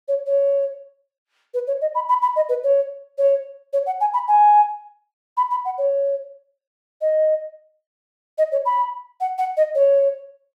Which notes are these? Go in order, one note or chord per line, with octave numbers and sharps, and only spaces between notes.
C#5
C#5
B4
C#5
D#5
B5
B5
B5
D#5
B4
C#5
C#5
C#5
F#5
G#5
B5
G#5
B5
B5
F#5
C#5
D#5
D#5
C#5
B5
F#5
F#5
D#5
C#5